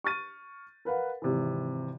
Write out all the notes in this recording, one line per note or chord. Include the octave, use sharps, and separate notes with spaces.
C#6 F6 A6 D#7
A#4 B4 F5 F#5
G#1 C3 E3